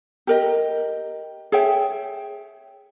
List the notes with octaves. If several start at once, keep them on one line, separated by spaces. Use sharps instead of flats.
G4 A#4 D#5
G#4 C#5 E5 G5